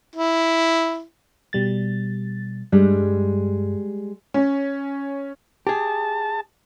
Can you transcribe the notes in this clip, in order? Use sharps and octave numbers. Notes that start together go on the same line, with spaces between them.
E4
B2 G3 A6
G2 G3 G#3
C#4
G4 G#4 A5